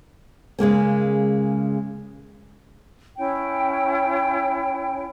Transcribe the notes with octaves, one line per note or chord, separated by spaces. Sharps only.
C#3 G#3 A#3 C#4
C#4 E4 C#5 G5